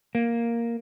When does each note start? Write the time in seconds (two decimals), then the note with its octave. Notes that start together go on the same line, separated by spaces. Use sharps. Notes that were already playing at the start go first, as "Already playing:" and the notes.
0.15 A#3